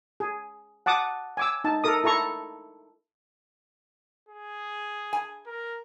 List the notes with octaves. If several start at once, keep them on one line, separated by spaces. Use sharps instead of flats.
G#4
F#5 A5 D6 D#6
G#5 D6 E6
D#4 A5
A4 A#4 D#6
E4 A4 A#5 C#6
G#4
G#5
A#4